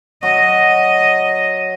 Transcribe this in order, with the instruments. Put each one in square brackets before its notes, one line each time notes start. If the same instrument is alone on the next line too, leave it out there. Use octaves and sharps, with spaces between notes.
[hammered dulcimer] F#3 [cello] D#5